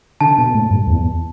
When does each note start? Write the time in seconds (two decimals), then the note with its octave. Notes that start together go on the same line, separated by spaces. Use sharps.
0.21 D3 A5
0.38 B2
0.54 A2
0.71 G2
0.88 E2